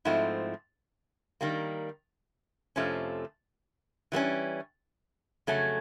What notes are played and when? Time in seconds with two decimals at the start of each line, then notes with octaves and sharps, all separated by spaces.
0.05 G#2 F3 A3 C4 E4
1.41 D#3 G3 A#3
2.76 F2 C3 F3 A3 C#4
4.12 E3 G3 A#3 C#4
5.47 F2 C#3 F#3 A3 C#4